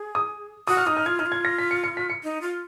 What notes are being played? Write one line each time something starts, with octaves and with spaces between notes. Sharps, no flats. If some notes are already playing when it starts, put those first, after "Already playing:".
Already playing: G#4
D#6
F#4 D#6
F6
D#4 D#6
F6
F4 G#6
D#4 F6
F4
G#6
A#6
B6
C#7
C#7
B6
C#7
D#4
F4